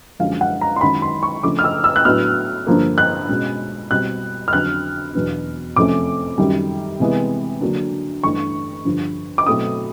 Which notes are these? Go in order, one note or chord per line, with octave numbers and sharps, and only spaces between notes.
F#2 D3 F3 G#3 F5
F#5
A#5
C6
F#2 D#3 G#3 B5
C6
C#6
C#3 F3 A3 D4 D6
F6
E6
E6
F#6
A2 F#3 B3 D4 F6
G2 D3 F3 A#3
F#6
B2 G#3 C#4
B2 G3 C4 F#6
F6
F2 D3 F#3 F#6
E2 B2 F#3 B3 D4
F2 C3 F3 A3 C#4 D6
F#2 D#3 G3
C3 E3 G#3 B3
D3 F#3 A#3 D4
G2 E3 A3 D4 C#6
G2 D3 F3
D6
B2 F#3 A3 C4 D#6